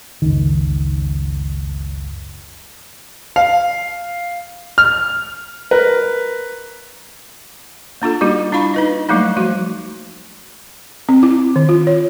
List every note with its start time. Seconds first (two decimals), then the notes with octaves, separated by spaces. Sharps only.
0.22 F#1 C#2 D#3
3.36 F5
4.78 F6
5.71 A#4 B4
8.02 A#3 D4 F4 A4
8.21 G3 A#3 D4 D#4 F#4 G4
8.52 D4 E4 F4 F5 B5 C#6
8.74 D#4 B4 D#5
9.09 F#3 G3 A3 A#3 D#4
9.37 F3 A3 F#4
11.09 C4
11.23 E4
11.56 D#3
11.69 F4
11.87 C#5